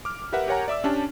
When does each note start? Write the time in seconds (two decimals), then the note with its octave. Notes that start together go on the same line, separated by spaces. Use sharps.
0.05 D6 F6
0.33 G4 A#4 B4 E5 F#5
0.48 G4 A#4 C#5 F#5 G#5 A#5
0.68 D5 E5 D6 E6
0.84 C#4 D4 G4 A5